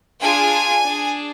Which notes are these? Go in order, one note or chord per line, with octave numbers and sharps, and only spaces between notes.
D4 F4 G#4 G#5
D4 G#4